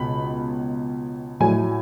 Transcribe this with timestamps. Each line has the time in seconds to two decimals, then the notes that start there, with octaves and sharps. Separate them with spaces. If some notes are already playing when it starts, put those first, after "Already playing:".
Already playing: C#2 B2 B5
1.40 A2 F#3 G#5